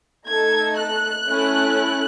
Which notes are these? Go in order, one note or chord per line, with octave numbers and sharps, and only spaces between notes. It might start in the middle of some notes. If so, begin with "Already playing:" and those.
A3 D#4 A4 G#6
F#6
A3 C#4 E4 A4